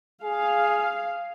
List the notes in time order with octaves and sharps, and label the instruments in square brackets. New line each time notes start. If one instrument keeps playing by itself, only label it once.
[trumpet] G#4 [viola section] F5